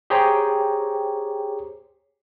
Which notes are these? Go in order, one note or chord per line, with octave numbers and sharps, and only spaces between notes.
G4 G#4 C5 C#5 G5 A#5